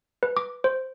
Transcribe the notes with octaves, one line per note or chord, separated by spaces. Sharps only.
B4
D6
C5